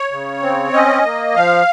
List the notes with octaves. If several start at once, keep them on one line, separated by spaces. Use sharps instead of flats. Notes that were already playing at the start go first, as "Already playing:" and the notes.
Already playing: C#5
C#3
C4
C#4 D#5
A#3
F3 F5